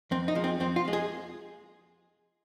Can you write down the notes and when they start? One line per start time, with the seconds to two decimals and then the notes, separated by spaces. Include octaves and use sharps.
0.11 F2 C4
0.28 D#4
0.35 F3 G#3
0.44 C4
0.60 F2 C4
0.76 F4
0.85 F3 G#3
0.93 G#4